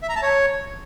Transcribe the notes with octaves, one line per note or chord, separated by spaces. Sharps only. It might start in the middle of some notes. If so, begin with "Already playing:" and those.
E5
A#5
A5
C#5